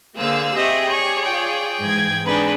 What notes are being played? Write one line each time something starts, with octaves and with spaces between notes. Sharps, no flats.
D3 A#3 G#4 C5 F5 E6
C4 G4 D#5 E5 G5 C#6
C#5 D5 C#6
F4 G5
G#2 E3 G#6
C4 D4 D#4 G#4 B4 B5